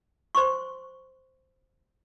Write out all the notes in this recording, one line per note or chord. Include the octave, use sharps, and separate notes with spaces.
C5 C6 C#6